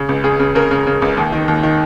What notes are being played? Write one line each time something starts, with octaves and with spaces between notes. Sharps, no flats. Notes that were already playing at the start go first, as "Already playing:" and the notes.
Already playing: C#3
C#2
C#3 G#4
C#3
C#3 A#4
C#3
C#3
C#2
D#2
D#3
D#2
D#3